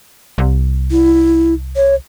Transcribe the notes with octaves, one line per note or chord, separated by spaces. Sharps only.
C2
E4
C#5